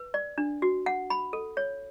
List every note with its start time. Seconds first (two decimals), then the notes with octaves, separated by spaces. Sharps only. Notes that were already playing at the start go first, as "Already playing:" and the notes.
Already playing: B4
0.14 D5
0.38 D4
0.62 F#4
0.86 F#5
1.10 B5
1.33 A4
1.57 C#5